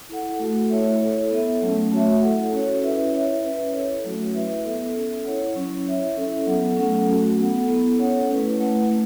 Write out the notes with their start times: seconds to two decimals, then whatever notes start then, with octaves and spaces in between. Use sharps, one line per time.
0.09 E4 A4 F#5
0.39 A3 F#4 A4 F#5
0.70 A3 E4 C#5 E5
1.01 E4 A4 C#5
1.30 B3 A4 E5
1.62 F#3 A3 C#4
1.92 A3 F#4 C#5 E5
2.21 E4 A4 F#5
2.53 C#4 F#4 A4 C#5
2.82 C#4 E4 B4 E5
3.13 E4 C#5 E5
3.43 C#4 E4 B4 E5
3.73 E4 A4 C#5
4.04 F#3 A3 C#4 F#4
4.35 E4 B4 E5
4.65 B3 A4 E5
4.95 C#4 A4 E5
5.25 E4 C#5 F#5
5.55 F#3 C#4 E4
5.87 E4 C#5 E5
6.16 C#4 E4 A4 E5
6.46 F#3 B3 A4 F#5
6.77 F#3 A3 C#4 A4 F#5
7.07 F#3 A3 C#4 F#4
7.38 B3 A4 F#5
7.67 B3 E4 A4
7.99 C#4 A4 C#5 F#5
8.29 A3 C#4 E4 B4
8.59 A3 E4 B4 F#5
8.90 A3 C#4